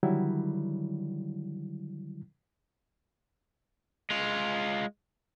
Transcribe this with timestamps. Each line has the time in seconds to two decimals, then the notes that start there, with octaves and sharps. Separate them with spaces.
0.03 D3 D#3 F#3 G3 E4
4.10 G#3 F4